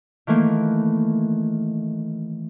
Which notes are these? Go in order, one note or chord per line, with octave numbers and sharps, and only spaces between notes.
D#3 E3 A3 A#3